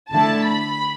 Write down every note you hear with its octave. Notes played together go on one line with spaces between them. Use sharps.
D3 A3 E4 A5
B5